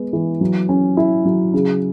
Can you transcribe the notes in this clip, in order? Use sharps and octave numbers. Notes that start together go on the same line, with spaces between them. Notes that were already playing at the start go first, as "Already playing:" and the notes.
Already playing: G#3 B3
E3
F#3
C#4
E4
F#3
C#3